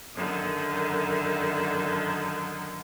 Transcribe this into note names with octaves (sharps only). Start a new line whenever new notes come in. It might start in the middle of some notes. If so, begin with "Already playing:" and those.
F#2 D3 D#3